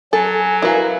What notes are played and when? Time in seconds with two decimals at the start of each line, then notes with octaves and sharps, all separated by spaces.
0.13 F#3 A4 G#5
0.62 E4 F#4 A#4 B4 F5